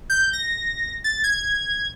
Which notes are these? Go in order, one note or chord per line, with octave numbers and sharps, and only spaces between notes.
G6
A#6
A6
G#6